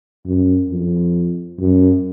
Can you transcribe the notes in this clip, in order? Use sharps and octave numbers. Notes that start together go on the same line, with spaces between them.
F#2
F2
F#2